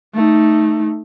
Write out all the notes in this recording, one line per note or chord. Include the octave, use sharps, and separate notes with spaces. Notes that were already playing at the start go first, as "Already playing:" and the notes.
A3 D#4